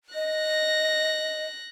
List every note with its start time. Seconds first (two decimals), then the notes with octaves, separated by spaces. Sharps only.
0.15 D#5 F#6 A#6